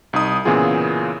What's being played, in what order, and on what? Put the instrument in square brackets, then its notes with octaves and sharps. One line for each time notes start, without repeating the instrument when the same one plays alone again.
[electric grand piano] C2 D#4 D#6
A#2 C#3 E3 B3 F4 G#4